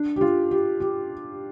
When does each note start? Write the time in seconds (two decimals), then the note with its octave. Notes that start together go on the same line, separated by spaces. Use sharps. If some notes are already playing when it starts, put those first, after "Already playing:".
Already playing: D4
0.16 G4
0.21 F4
0.51 G4
0.80 G4